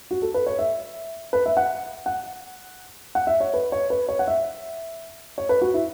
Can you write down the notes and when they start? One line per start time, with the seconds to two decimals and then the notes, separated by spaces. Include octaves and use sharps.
0.11 F#4
0.22 A4
0.34 B4
0.46 C#5
0.59 E5
1.33 B4
1.46 E5
1.57 F#5
2.06 F#5
3.15 F#5
3.27 E5
3.40 C#5
3.54 B4
3.72 C#5
3.90 B4
4.09 C#5
4.19 F#5
4.27 E5
5.38 C#5
5.49 B4
5.61 F#4
5.74 E4